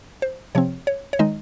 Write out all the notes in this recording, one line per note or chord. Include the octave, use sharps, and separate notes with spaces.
C5
C3 F3 C4 C#5
C#5
C#5
D#3 G#3 D#4 D#5